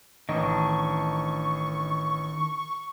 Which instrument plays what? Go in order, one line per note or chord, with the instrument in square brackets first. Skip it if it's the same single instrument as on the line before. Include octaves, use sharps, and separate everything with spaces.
[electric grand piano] A1 D#5 [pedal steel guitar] D#3 D4 [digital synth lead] C#6